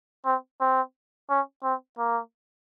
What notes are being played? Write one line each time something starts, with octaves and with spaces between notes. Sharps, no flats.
C4
C4
C#4
C4
A#3